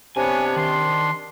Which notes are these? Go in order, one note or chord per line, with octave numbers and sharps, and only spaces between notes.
C3 B3 D4 C#5 G#5
D#3 C6